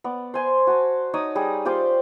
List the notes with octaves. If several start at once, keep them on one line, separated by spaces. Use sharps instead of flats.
B3 D5
C5 G#5 C6
F#4 A5
D#4 C#5 D5 D#6
G3 G#4
F4 G4 C5 D5